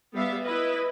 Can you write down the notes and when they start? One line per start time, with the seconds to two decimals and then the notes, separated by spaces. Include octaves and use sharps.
0.14 G3 B3 E5 F5
0.44 E4 B4 D#5